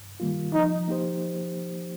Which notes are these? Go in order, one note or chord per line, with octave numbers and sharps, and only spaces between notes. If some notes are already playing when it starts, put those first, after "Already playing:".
Already playing: G2
D#3 G3 A#3 F4
F3 D#4
A#3 D#4 G4 C5